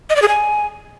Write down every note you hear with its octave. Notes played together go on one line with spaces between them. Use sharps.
D#5
D5
G#4
G#5